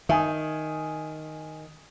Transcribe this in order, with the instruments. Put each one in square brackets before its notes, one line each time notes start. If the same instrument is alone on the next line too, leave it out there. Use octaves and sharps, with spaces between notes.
[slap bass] D#3 [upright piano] E5 G#5 D#6